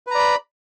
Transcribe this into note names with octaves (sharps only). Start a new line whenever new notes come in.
B4 D5 A#5 B5